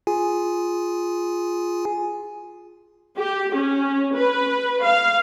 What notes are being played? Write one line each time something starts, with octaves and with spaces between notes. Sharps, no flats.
F4 G#4 G#5
G4
C#4
B4
F5